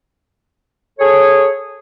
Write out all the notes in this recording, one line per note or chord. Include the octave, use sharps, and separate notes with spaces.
G#4 A4 C#5